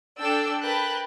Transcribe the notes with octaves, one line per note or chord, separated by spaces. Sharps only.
D4 A4 D5 G5 E6
A#4 B4 G5 A5 B5 F#6